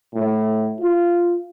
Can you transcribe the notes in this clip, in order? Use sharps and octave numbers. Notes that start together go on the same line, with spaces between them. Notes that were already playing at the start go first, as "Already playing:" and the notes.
A2
F4